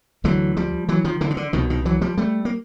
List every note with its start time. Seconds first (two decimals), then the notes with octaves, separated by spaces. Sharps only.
0.24 D2 D3 E3 F#3
0.57 F3 G3
0.89 E3 F#3
1.04 D#3 F3
1.21 D3 E3
1.30 D#3
1.37 D3
1.53 C2 B2 D#3
1.70 D#3
1.85 E3 F#3
2.01 F3 G3
2.18 G3 A3
2.45 A#3